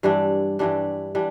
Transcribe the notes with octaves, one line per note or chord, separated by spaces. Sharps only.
G2 E3 G3 D4
G2 E3 G3 D4
E3 G3 D4